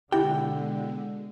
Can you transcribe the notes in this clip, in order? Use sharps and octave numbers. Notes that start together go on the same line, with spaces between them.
B2 D3 G#3 E4 G4 G5